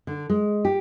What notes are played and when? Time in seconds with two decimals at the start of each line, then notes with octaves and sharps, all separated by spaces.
0.07 D3
0.30 G#3
0.65 G4